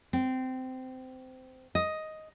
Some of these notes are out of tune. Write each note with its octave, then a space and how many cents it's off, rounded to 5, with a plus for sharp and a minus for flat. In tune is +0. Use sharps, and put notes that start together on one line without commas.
C4 -20
D#5 +5